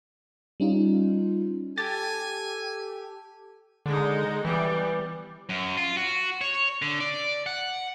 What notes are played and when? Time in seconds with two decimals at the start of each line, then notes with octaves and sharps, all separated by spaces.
0.60 G3 C#4 D#4 F4
1.78 G4 A4 G#5 A6
3.86 D3 G#3 D#4
4.45 E3 G3 B3
5.49 F#2
5.77 F4
5.97 F#4
6.41 C#5
6.82 D3
7.00 D5
7.46 F#5